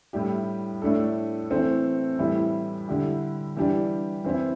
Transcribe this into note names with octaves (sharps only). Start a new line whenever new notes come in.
A2 G3 E4 G4
A2 A3 D4 A4
E3 A3 C4 A4
A2 E3 G3 E4
D3 G3 E4 G4
E3 G3 D4 G4
E3 C4 E4